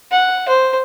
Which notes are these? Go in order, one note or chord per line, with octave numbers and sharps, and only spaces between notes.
F#5
C5